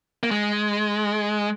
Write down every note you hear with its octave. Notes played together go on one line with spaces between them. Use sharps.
A#3
G#3